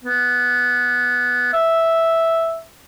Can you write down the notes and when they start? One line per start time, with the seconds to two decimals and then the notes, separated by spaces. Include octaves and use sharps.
0.04 B3
1.53 E5